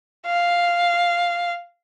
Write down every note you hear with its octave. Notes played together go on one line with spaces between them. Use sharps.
F5